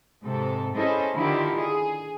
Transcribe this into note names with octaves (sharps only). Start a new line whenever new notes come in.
G#2 C3 A4
C#4 E4 G#4 A4 C5 D#5
D3 D#3 E4 F4 G4
G#4